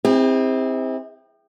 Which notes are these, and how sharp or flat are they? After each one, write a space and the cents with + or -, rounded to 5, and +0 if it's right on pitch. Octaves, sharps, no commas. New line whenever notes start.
C4 +0 E4 -40 G#4 -45